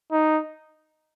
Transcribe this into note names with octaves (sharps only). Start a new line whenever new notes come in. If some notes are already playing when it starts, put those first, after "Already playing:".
D#4